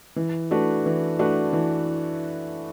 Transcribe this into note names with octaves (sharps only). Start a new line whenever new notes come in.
E3
A3 D4 F#4 B4
E3
A3 D4 F#4 B4
E3